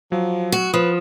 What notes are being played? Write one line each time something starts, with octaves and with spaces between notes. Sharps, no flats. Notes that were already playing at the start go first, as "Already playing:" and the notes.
F3 F#3
F#4
F3 B4 D#6